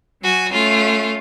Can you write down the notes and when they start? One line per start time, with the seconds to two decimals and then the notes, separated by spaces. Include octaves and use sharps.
0.23 F#3 F#4 G#5
0.51 A3 C#4 F4